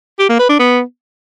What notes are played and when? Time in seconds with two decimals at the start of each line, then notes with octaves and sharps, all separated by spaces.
0.19 G4
0.29 A#3
0.39 B4
0.49 D4
0.59 B3